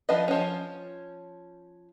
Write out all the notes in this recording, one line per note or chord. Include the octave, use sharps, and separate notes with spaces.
F3 D4 B4 D#5
F3 C#4